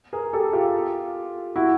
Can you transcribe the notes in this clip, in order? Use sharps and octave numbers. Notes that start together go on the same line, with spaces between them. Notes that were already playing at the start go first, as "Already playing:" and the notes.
G#4 A#4
G4 A4
F4 G4
E4 F#4